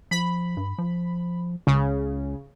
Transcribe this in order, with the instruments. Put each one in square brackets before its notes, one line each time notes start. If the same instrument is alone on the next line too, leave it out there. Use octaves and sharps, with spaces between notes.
[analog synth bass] F3 [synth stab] B5
[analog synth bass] G2
F3
[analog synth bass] C#2 [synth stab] C#3